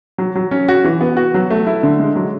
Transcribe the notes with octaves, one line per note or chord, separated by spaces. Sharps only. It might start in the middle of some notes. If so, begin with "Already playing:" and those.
F#3
F#3
C#4
F#4
E3
B3
F#4
F#3
A3
E4
D3
G#3
F#3